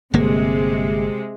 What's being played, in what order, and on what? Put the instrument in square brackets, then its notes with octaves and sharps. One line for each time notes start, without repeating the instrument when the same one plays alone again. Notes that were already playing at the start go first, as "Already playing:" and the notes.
[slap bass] G1 A#3 [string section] C3 G#3